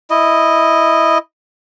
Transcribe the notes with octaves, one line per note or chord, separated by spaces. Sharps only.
E4 D#5